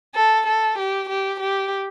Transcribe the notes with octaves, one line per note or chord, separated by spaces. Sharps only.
A4
A4
G4
G4
G4